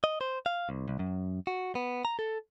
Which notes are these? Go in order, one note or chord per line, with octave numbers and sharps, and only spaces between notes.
D#5
C5
F5
C2
C2
F#2
F#4
B3
A#5
A4